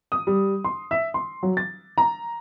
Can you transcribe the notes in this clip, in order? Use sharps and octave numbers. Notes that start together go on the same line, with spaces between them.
D#6
G3
C6
E5
C6
F#3
A6
A#5